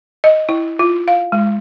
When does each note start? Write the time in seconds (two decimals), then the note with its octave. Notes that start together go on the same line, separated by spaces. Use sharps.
0.24 D#5
0.49 E4
0.79 F4
1.08 F5
1.32 G#3